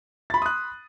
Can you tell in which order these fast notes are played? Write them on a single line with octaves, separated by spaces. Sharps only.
A6 B5 C6 D#6 F#6